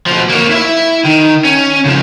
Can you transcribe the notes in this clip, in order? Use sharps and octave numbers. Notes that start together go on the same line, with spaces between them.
B2 F3
A#3 C#5
E4 E5
D#3
C#4
C#3 F3